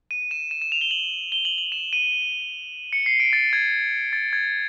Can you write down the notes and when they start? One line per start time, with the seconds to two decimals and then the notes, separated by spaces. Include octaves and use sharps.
0.11 D#7
0.31 E7
0.51 E7
0.62 E7
0.72 F7
0.81 G7
0.91 F#7
1.32 G7
1.45 F#7
1.58 F#7
1.72 E7
1.93 D#7
2.93 C#7
3.06 C7
3.20 D7
3.33 A6
3.53 G#6
4.13 A6
4.33 G#6